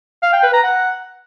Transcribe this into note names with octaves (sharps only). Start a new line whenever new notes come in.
F5
G5
B4
A#5
F#5